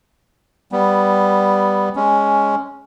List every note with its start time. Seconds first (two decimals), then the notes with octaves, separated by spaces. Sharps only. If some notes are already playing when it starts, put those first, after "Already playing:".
0.72 G3 B3
1.96 G#3 C#4